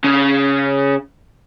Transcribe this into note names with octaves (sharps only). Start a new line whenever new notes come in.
C#3